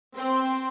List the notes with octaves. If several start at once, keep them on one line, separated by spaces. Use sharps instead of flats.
C4